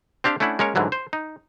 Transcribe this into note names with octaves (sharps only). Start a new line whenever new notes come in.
C4 D4 G4 F5
A3 C#4 D4 E4 F#5
G#3 A#3 C#4 A#4 C#5
G#2 D3 E3 F#3 G3
C5
D#4